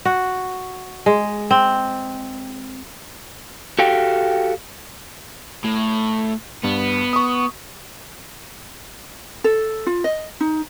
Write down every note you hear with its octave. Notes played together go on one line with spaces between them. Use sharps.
F#4
G#3
C4
F#4 G4 A4 F5 G5
A2
G2 B3
C#6 D#6
A4
F4
D#5
D#4